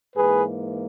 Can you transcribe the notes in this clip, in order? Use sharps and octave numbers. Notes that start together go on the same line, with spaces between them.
G#2 E3 A#3 G#4 B4